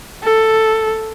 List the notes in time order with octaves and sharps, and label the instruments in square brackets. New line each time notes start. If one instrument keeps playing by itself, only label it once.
[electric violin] A4